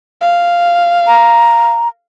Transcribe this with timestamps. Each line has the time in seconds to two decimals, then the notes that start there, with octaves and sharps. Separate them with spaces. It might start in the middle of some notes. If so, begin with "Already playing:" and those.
0.21 F5
1.07 A#5